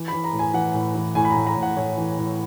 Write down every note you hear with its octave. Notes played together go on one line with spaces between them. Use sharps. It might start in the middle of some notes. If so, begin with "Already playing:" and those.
Already playing: E3
B5
E3
A#5
A2
G#5
E3 F#5
A2
E3
A2 G#5
B5
A#5
A2
A#5
A2
F#5
A2 C#5
E3
A2